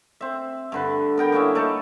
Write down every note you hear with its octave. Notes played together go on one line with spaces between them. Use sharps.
C4 E5
G2 D3 B4
B3 A#4 G5
A#3 B3 C#4 E4
A3 D#4 A4